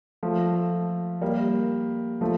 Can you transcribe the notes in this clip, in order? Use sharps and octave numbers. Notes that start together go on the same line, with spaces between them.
F3 A3
G3 A#3
F3 A3